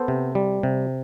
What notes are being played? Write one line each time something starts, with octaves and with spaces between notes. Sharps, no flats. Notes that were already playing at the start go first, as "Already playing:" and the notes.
Already playing: B3 A4 C5
C3
G3
C3